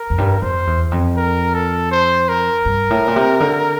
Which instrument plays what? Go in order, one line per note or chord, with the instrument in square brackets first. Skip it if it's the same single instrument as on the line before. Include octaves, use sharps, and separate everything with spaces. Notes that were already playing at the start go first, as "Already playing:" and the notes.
Already playing: [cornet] A#4
[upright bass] F2
G2
[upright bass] F2 [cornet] C5
[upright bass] E2
F2
[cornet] A#4
A4
C5
A#4
[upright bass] G2
A2
A#2
C3
D3